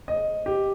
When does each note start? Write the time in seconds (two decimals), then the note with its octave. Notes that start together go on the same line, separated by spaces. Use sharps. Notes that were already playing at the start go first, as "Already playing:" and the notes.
0.08 D#5
0.46 G4